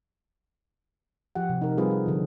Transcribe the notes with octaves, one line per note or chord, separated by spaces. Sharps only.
F3 G4 F#5
C3
D#4 A#4
G3 C4 F4 G#4 B4 C5
G#4
D3 F3